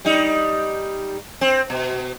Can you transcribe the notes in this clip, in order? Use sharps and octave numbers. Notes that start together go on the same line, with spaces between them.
G3 D#4
C4
B2